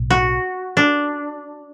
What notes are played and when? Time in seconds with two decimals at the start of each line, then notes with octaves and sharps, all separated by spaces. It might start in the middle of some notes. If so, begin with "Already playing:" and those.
Already playing: B1 A2
0.10 F#4
0.77 D4